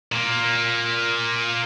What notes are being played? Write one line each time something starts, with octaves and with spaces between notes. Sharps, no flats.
A#2 A#3